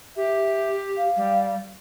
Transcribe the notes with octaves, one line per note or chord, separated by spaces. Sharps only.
G4 E5
F5
G3